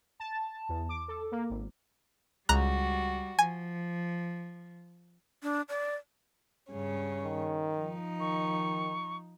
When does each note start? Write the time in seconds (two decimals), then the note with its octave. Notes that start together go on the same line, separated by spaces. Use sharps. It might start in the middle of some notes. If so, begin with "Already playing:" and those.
0.20 A5
0.69 E2
0.89 D6
1.08 A4
1.32 A#3
1.50 G#1
2.49 C#2 G3 F#4 A#5 F#6
3.39 F3 G#5
5.43 D4
5.69 D5
6.71 G2 C#3 C#4
7.24 D#3
7.75 F3 D#4
8.20 D#3 C#6